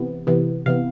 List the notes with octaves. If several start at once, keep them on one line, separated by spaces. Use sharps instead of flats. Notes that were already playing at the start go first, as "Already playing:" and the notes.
Already playing: C3 E3 B3
C3 E3 B3
C3 E3 B3 F5